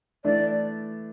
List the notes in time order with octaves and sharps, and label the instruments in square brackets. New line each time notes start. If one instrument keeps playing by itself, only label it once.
[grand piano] E3 A3 D4 [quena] D5